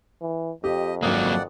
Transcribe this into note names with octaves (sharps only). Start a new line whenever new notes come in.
E3
F2 G4 D#5
G#1 F#3 A#3 D5 F#5 D#6